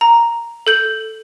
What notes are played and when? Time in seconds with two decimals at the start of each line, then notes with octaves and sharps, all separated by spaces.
0.01 A#5
0.67 A4 G6 F#7